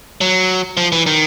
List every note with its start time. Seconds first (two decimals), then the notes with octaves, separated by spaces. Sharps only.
0.21 F#3
0.77 F3
0.92 E3
1.06 D#3